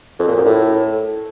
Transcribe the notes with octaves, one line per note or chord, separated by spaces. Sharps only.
F2
A#2
F#2
A2